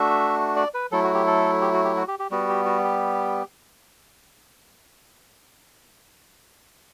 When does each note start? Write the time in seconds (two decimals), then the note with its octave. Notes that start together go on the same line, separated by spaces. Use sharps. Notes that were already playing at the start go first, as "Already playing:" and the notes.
Already playing: A3 D4 F#4 E5
0.56 D5
0.74 B4
0.92 F#3 A3 E4 A4
1.04 F#4
1.14 G4
1.27 A4
1.62 G4
1.73 F#4
1.84 G4
1.97 F#4
2.08 G4
2.19 G4
2.31 G3 B3 F#4
2.49 G4
2.65 F#4
2.84 G4